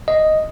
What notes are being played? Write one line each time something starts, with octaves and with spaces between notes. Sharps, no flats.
D#5